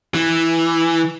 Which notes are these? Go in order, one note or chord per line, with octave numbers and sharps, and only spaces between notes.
E3